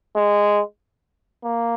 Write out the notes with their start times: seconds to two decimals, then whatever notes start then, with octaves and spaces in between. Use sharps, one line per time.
0.15 G#3
1.44 A#3